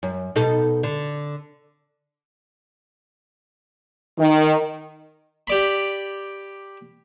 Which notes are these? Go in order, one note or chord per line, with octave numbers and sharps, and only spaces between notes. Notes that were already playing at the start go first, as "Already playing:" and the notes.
F#2
B2 D#4 A4
D3
D#3
G4 D5 B5